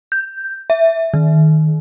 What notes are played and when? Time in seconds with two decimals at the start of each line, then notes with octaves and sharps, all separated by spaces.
0.12 G6
0.70 E5
1.14 D#3